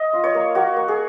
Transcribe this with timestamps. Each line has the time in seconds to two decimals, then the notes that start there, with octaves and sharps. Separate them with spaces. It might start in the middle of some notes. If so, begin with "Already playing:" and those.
Already playing: D#5
0.13 F4
0.24 C#5
0.35 A#3
0.55 A#3 F#4
0.76 A#3
0.88 G#4